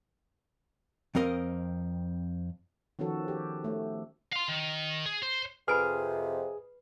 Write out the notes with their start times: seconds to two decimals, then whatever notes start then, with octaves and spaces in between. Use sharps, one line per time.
1.15 F2 C4 A#4 D#5
2.99 D#3 F3 B3 C#4 F#4 A4
3.28 G4
3.64 A3
4.33 F5 C6
4.49 D#3
5.06 G#4
5.23 C5
5.68 F2 C3 G#4 B4 B5 F6 D7